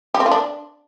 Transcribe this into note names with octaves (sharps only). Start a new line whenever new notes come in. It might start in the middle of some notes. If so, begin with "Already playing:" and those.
G4
C4
F4
D4